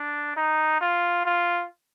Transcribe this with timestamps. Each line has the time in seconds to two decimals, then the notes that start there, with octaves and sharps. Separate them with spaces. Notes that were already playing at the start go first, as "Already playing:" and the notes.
Already playing: D4
0.37 D#4
0.81 F4
1.25 F4